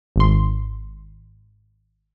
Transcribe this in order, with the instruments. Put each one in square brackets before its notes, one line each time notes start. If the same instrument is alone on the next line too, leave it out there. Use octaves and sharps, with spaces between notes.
[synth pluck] G#1 C6